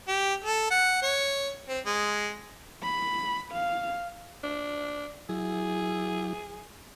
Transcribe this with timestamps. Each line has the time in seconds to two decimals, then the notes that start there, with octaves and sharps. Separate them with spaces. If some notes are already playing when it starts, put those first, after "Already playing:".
0.08 G4
0.44 A4
0.71 F#5
1.02 C#5
1.68 C4
1.86 G#3
2.83 B5
3.52 F5
4.43 D4
5.29 F#3 E4 G#4